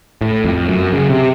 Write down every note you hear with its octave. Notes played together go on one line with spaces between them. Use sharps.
A2
F2
F#2
C#3
C3